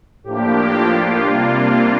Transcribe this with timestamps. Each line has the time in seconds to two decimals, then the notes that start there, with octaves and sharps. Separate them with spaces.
0.24 A2 F3 A#3 D4 G4
0.74 F4
1.24 C3 G3 A#3 D4 F4